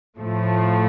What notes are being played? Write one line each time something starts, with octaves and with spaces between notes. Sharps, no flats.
A2 F3 A3